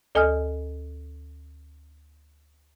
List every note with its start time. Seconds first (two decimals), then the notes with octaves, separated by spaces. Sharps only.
0.15 D2 A4 D#5 G#5 D#6 F6